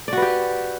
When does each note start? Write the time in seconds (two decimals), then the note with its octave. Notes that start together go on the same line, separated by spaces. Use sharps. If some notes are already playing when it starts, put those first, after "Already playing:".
0.08 D5
0.13 F#4
0.17 B4
0.22 G4